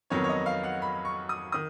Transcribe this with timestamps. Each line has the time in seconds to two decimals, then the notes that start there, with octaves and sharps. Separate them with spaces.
0.10 F2 D#3 F#3 B3 C#5
0.24 C#5
0.29 D#5
0.46 F5
0.64 F#5
0.82 B5
1.05 C#6
1.29 D#6
1.52 D#3 D#6